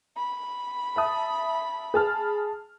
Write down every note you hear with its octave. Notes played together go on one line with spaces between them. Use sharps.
B5
E5 A5 D#6
G#4 A5 F6